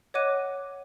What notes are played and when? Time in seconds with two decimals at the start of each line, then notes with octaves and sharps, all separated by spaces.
0.14 C#5 D#5 F#5 D6 F#6 D#7